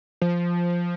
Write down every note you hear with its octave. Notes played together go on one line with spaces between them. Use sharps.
F3